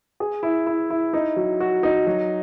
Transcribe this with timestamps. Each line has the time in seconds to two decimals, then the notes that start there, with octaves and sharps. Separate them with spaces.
0.20 G#4
0.43 E4
0.67 E4
0.90 E4
1.13 D#4
1.36 F#3
1.60 F#4
1.83 D#4
2.07 F#3